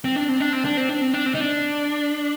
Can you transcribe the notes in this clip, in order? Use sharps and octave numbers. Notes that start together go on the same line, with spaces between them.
C4
D4
C4
D4
C4
D4
C4
D4
C4
D4
C4
D#4
D4